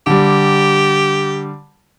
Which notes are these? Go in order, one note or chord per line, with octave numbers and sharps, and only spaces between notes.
D3 G3 G4